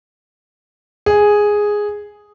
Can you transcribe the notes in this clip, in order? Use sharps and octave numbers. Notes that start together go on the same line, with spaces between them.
G#4